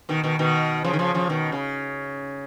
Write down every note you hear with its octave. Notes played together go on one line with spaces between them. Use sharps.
B2 D#3
B2 D#3
B2 D#3
C#3 F3
D#3
C#3 F3
C#3 F3
B2 D#3
C#3